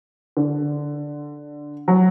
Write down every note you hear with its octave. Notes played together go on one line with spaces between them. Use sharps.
D3
F#3